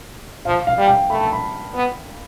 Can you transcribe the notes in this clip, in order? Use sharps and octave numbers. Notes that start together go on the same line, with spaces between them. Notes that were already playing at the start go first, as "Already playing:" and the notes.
F3 F5
F5
G3
G5
A3 B5
A5
B5
B3